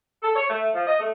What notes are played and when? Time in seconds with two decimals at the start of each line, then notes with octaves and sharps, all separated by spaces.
0.23 A4
0.36 C#5
0.49 A3
0.74 F3
0.87 D#5
1.00 A3